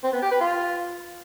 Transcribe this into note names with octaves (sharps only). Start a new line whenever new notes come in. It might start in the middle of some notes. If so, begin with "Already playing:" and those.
C4
B3
G4
B4
F4